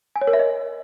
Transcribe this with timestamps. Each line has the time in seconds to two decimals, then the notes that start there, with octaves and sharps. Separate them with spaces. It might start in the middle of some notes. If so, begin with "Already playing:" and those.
0.16 G#5
0.21 C#5
0.27 A#4
0.33 E5
0.39 D#5